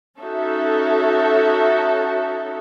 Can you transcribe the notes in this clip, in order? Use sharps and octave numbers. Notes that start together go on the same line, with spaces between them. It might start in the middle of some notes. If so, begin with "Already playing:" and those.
C#4 D#4 F#4 A4 E5